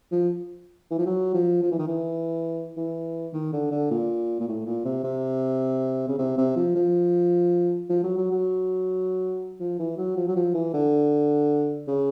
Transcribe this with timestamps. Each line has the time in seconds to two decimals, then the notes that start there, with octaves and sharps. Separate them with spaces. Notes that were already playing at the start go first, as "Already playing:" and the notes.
0.12 F3
0.91 E3
0.98 F3
1.06 F#3
1.34 F3
1.62 F3
1.71 E3
1.79 D#3
1.88 E3
2.77 E3
3.33 D#3
3.53 D3
3.71 D3
3.91 A#2
4.40 A#2
4.48 A2
4.66 A#2
4.85 C3
5.04 C3
6.08 C#3
6.18 C3
6.38 C3
6.56 F3
6.75 F3
7.89 F3
8.04 F#3
8.17 F#3
8.32 F#3
9.60 F3
9.79 E3
9.97 F#3
10.17 F3
10.27 F#3
10.36 F3
10.54 E3
10.74 D3
11.88 C#3